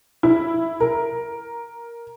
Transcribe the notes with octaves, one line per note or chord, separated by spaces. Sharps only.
E4
A#4